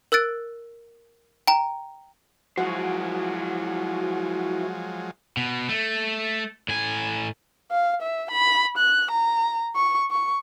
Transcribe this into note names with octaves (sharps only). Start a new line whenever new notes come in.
A#4 E6 F#6 A6 D7
G5 A#5
F3 F#3 G#3 E4 F#4 C5
B2
A3
A2 G#5
F5
E5
B5
F#6
A#5
C#6
C#6